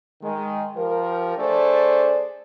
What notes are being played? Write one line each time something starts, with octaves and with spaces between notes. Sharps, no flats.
D#3 G#3
F3 G4 A#4
A3 D4 G#4 C5 D5